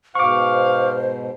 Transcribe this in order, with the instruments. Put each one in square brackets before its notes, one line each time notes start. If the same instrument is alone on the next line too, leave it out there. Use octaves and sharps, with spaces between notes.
[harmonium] G#2 B2 [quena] C5 [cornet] F5 [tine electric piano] C#6 D6